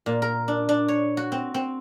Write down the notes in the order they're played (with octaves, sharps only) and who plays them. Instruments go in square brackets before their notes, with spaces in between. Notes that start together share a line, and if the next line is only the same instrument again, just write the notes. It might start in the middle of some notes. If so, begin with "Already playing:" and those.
[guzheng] A#2
A#4
D4
D4
C#5
F#4
C4
C4